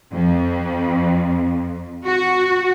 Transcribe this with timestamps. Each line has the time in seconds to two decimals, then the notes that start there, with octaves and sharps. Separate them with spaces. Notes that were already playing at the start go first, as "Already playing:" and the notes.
0.13 F2
2.05 F#4